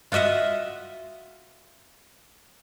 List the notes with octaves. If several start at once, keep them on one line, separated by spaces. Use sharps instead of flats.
F4 F#4 D#5 E5 F#5